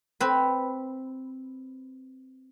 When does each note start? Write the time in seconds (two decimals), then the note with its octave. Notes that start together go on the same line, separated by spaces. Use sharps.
0.20 C4 B4